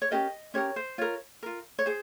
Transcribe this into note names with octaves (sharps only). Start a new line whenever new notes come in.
C#5
C#4 G4 A#4 D#5
C#4 G4 A#4 C#5
C5
F4 A#4 C#5
F4 A#4
C#5
G#4 C5